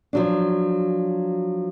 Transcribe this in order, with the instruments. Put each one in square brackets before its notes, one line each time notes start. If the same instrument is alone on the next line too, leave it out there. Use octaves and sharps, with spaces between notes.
[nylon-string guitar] F3 F#3 D4